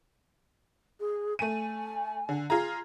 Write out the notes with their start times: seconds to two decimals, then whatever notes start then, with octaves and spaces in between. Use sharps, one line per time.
1.00 G#4
1.39 A3 G#5 D#7
2.29 D3
2.50 F4 G#4 A#5